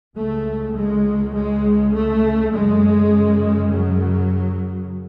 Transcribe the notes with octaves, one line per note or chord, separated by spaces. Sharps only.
C#2 C#3 A3
G#3
G#3
A3
F#2 C#3 G#3
F#3